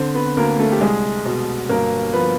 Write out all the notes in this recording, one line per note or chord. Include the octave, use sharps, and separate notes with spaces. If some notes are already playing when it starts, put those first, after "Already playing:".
Already playing: D3 C4 C5
B3 B4
D2 A#3 A#4
A3 A4
G4
C2 G#3 G#4
B2
G1 A#3 A#4
F3 B3 B4